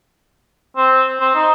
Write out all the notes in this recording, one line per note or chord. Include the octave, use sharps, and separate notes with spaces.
C4
C4
D#4